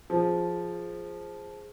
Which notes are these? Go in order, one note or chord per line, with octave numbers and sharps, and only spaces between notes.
F3 G#4 C5